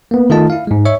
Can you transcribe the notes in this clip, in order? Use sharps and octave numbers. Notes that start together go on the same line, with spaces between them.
A#3 B3
D#3 A3 F4 D#5 A5
E4 F5
G#2 G#3
C#5 D#5 E5 C#6